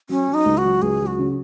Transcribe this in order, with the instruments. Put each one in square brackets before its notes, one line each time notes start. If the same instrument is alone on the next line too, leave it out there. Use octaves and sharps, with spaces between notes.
[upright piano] F#3 [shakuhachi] C#4
[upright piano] F#3
[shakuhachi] D#4
[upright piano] C#2
[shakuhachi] F#4
[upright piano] F#3
[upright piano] C#2 [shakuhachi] G#4
[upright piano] F#3
[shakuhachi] F#4
[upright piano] C#3